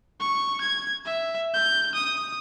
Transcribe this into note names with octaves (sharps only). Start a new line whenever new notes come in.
C#6
G#6
E5
G6
D#6